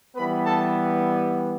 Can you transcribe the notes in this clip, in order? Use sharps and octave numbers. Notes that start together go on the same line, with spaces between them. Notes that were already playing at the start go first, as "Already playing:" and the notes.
E3 G3 B3 B4 B5
A4 A5